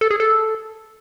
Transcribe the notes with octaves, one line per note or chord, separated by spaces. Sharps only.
A4
G#4
A4